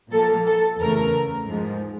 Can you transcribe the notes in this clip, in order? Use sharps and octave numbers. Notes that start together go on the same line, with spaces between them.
A#2 F3 A#3 A4
A4
E2 C#3 E3 A3 A#4
G#2 F3 G#3